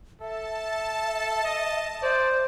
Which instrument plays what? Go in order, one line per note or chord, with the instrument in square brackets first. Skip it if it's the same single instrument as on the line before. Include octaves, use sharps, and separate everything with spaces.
[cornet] A4 [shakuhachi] E5 [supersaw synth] A5
[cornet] D#5
[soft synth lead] C5 [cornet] D5